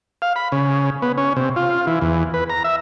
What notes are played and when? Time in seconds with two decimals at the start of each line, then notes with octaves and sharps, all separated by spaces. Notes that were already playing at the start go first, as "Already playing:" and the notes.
0.22 F5
0.36 B5
0.52 C#3
1.02 B3
1.18 C#4
1.36 C3
1.56 F4
1.87 E3
2.01 E2
2.34 B4
2.50 A#5
2.64 E5